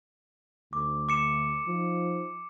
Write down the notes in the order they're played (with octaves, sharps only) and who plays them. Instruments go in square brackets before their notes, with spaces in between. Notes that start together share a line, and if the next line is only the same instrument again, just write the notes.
[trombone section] D2 [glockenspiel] D6
[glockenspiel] D6 C#7 E7
[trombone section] F3 D#4